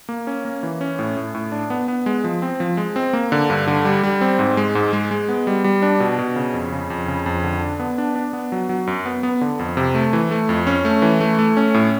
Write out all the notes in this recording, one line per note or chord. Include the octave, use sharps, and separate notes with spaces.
A#3
C#4
A#3
E3
C#4
A2
A2
A2
D4
B3
B3
G#3
F3
C4
F3
G#3
C4
A#3
D3
G2
D3
G3
G3
C4
G#2
G#3
G#2
G#3
G#3
B3
G3
G3
D4
B2
B2
C#3
F2
C#3
F2
C#3
F2
D3
D4
B3
D4
D4
B3
F#3
F#3
F#2
B3
B3
D3
F2
C3
A3
E3
A3
F2
C#4
A3
E3
A3
A3
C#4
A2